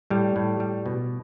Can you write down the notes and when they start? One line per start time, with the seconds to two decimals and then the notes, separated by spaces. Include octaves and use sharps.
0.10 A2 G3
0.36 A2
0.60 G3
0.86 B2